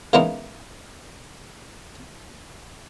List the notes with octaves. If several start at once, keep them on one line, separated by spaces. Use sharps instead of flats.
C#3 E3 G#3 A#3 B3 D#4